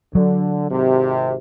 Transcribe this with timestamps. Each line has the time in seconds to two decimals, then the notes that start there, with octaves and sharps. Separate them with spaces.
0.15 D3 F#3
0.71 G#1 C3